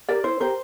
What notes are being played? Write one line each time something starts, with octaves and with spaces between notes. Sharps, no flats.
G4 A#4 D5
E4 C5
G4 A#4 C5